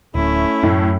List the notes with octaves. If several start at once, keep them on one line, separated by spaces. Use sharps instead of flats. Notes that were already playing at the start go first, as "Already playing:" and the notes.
D1 A3 C#4 E4
F#2 A2